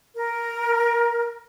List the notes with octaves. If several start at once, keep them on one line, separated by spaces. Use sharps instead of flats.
A#4